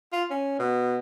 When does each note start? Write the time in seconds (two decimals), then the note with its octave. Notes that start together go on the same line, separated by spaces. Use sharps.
0.12 F4
0.30 C#4
0.59 B2